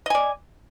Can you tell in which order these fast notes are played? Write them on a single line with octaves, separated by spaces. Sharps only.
D#5 G#5 D5